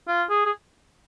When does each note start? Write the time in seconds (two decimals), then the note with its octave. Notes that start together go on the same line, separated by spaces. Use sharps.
0.08 F4
0.30 G#4
0.46 G#4